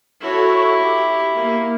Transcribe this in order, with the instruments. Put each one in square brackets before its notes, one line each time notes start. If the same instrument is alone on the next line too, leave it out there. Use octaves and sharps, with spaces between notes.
[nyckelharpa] E4 [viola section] F#4 A4 C#5
[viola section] G4
A#3